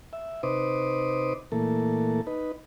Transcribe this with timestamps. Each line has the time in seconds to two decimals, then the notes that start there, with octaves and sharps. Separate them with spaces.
0.13 E5
0.43 C3 D#4 B4 C5 D6 D#6
1.52 A#2 E3 A3 A#3 A4
2.27 D#4 B4